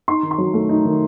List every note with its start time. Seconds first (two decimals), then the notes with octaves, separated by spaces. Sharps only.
0.08 D#4 C6
0.23 D#3
0.31 C6
0.38 F#3
0.54 A3
0.69 D#4
0.85 D#3